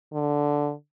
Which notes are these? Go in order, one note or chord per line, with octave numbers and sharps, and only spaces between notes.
D3